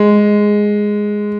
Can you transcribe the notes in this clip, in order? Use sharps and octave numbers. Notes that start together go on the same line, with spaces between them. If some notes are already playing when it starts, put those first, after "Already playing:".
Already playing: G#3